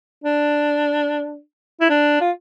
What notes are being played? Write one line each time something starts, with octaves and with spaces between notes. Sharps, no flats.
D4
E4
D4
F4